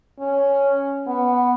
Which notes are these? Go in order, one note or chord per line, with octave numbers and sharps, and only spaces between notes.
C#4
B3